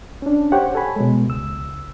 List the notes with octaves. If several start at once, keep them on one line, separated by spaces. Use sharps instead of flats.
C#4 D4
G4 C5 C#5 F#5 G5
A4 C#5 G#5 B5
B2 G#3
C#2 E6